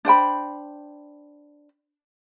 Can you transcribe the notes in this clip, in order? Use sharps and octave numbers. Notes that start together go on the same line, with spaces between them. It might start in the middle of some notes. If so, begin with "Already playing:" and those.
D4 C5 G5 B5